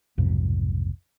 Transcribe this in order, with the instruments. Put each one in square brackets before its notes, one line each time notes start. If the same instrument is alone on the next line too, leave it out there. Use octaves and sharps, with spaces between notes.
[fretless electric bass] B1 F2 G#2 C3